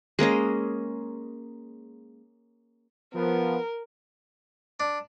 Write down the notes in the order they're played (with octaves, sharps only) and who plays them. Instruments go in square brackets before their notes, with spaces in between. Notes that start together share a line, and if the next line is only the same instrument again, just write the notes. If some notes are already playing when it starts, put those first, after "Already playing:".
[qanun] G#3 A#3 C#4 D#5
[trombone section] F3 B3 [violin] A#4
[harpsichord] D4